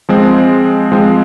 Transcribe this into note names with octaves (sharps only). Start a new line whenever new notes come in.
F3 G#3 C4
F3 G#3 C4